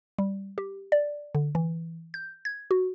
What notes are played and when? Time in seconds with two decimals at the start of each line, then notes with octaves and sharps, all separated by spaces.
0.19 G3
0.58 G4
0.92 D5
1.35 D3
1.55 E3
2.14 G6
2.45 G#6
2.71 F#4